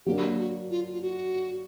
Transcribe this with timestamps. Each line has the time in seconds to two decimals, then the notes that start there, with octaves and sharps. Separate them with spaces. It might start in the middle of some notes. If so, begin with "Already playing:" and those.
0.06 F#3 A#3 D4 G4
0.38 F#4
0.71 F4
0.91 F4
1.02 F#4